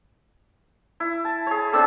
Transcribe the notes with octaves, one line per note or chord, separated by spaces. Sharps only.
E4
A5
G#4 C#5
C4 D4 G#4 A4